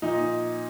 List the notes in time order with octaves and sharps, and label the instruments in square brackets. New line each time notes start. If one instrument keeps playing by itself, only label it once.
[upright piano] A#2 F3 D#4